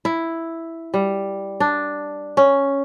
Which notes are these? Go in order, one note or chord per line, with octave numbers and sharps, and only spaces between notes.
E4
G3
D4
C#4